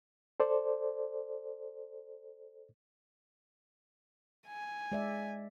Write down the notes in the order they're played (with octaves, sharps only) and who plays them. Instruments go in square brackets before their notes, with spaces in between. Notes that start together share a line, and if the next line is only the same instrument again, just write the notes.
[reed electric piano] A4 C5 D5
[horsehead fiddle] G#5
[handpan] G#3 D5 E5